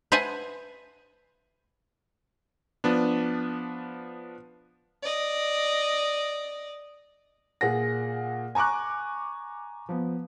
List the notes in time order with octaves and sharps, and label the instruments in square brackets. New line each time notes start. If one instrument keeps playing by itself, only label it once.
[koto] B4 C5 E5 F#5 G#5 A5
[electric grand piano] F3 B3 D4
[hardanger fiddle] D5 D#5
[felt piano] A#2 G#4 F#5 A#6
G#5 A#5 C#6 D6 F#6
F3 B3